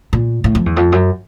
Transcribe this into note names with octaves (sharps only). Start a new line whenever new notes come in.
A#2
A2
F2
E2
F2
F#2